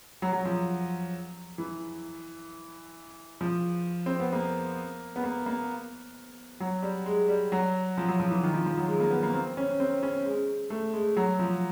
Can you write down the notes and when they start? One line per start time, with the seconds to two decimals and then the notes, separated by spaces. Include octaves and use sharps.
0.22 F#3
0.33 F#3
0.45 F3
1.58 E3
3.41 F3
4.06 C4
4.20 B3
4.33 A#3
5.16 B3
5.24 A#3
5.46 A#3
6.60 F#3
6.83 G3
7.06 G#3
7.28 G3
7.52 F#3
7.98 F3
8.08 F#3
8.20 F3
8.31 E3
8.43 D#3
8.54 F3
8.66 F3
8.77 F#3
8.88 G#3
9.00 A#3
9.11 B3
9.23 A#3
9.33 C4
9.57 C#4
9.80 C4
10.03 C#4
10.25 G#3
10.70 A3
10.93 G#3
11.17 F#3
11.39 F3